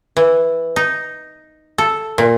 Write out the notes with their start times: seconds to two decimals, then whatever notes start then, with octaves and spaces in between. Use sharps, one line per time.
0.17 E3
0.76 D#4
1.78 A4
2.18 A#2